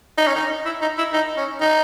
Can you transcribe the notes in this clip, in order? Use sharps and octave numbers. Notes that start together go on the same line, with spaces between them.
D#4
C#4
D#4
E4
D#4
E4
D#4
C#4
D#4